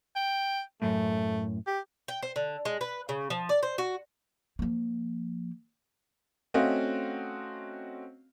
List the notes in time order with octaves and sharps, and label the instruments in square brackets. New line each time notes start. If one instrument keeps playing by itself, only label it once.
[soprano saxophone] G5
[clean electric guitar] F#2 A2 [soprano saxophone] A3
[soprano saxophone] G4
[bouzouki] G5
C5
D3
G#3
B4
C#3
F3
D5
C5
F#4
[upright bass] F3 A#3
[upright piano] A3 C4 C#4 F#4 D#5 F5